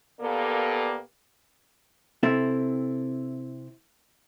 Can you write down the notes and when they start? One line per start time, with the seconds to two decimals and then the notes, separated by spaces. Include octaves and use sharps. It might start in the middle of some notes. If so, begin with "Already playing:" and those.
0.20 A#2 A#3 B3 G4 A4 D5
2.23 C3 C4 E4 A4 E5